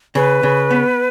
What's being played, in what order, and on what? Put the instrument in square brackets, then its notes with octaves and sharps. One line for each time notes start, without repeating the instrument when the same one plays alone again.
[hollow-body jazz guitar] C#3 [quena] B4
[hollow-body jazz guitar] C#3
B3